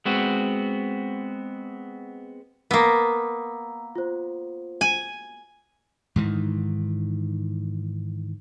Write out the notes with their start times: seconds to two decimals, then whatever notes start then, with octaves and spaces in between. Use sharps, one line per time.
0.05 G#3 B3 C4 F#4
2.71 A#3 B3 A#5 E6
3.95 F4 C5
4.81 G#5
6.16 G#2 D#3 E3